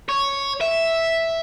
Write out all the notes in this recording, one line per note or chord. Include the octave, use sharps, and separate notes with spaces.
C#5
E5